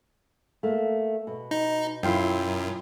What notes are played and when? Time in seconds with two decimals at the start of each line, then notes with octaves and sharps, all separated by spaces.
0.63 A3 A#3
1.27 B2
1.51 D#4
2.03 F#2 E4 F4 G5